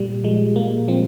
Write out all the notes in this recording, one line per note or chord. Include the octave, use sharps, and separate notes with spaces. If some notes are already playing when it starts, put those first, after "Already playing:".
Already playing: A#2 G3
F3 G#3
A#2 A#3
F3 C4